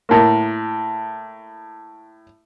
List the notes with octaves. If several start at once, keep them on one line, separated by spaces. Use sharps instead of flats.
A2 A#3